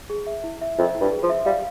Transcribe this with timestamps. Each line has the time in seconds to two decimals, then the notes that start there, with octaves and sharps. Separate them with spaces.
0.10 G#4
0.27 E5
0.44 E4
0.62 E5
0.78 F2 E5
0.95 E4
1.01 G2
1.12 G#4
1.23 F3
1.29 E5
1.45 G3 F5